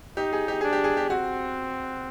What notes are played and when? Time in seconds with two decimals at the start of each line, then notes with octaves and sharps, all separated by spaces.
0.17 D#4 G4
0.33 G#4
0.48 G4
0.61 D4 G#4
0.73 G4
0.84 G#4
0.97 G4
1.10 C4 F#4